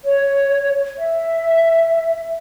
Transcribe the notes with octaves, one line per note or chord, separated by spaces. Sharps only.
C#5
E5